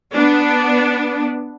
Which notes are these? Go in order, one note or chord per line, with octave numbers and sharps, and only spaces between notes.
B3 D4